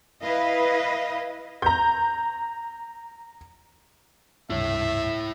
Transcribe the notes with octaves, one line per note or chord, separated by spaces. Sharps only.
E4 B4 D#5 F5
A#5 G6
C#2 G2 C3 E4 C#5 E5